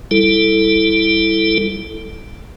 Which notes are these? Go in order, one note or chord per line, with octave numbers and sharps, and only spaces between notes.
G3 E4 A4